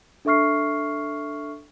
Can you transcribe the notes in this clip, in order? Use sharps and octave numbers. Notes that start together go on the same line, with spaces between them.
D4 A4 E5 C#6 F6 C7